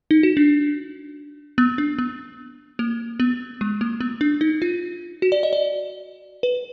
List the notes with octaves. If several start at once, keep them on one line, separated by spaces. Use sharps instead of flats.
D#4
F#4
D4
B3
D4
B3
A#3
B3
G#3
A#3
B3
D4
D#4
F4
F#4
D5
D#5
D5
B4